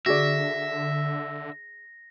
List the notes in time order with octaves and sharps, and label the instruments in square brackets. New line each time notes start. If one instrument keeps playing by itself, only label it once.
[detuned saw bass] D3 [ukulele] F#4 G#4 D5 [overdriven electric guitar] E5 [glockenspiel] A#6